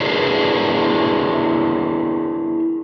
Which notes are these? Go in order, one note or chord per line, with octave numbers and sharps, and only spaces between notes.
D4 E4 G4 G#4 A#4 B4